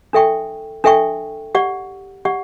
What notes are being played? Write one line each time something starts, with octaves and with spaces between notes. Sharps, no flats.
D4 A4 E5 G5 C#6
D4 A4 E5 G5 C#6
G4 D5 F#5
G4 D5 F#5